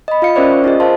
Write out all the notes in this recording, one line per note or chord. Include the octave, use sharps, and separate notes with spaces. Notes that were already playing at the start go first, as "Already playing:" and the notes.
D#5 B5
F4 F5 C#7
C#4 A#4 C5 D5 E5
C#6
D#4 F4 G#4 D#5
A#4 C5 F5 A5 C6